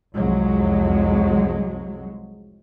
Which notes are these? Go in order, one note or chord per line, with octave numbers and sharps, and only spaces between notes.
C2 F2 F#3 G#3